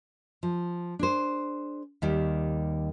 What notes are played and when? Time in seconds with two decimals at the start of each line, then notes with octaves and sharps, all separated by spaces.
0.43 F3
0.99 D4 G#4 C5
2.02 D#2 D#3 G3